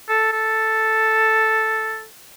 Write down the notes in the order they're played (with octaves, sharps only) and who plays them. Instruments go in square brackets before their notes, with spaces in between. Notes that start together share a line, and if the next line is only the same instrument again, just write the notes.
[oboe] A4
A4